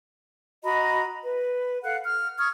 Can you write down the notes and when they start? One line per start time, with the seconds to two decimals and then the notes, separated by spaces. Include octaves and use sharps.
0.64 F#4 D#5 A#5 B5
1.24 B4
1.83 A4 F5 F#5 F#6
2.04 F6
2.38 C#6 D#6 F6 G#6